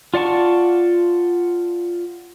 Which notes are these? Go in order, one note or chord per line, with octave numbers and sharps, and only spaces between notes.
F4 D5 F#5 A5 C#6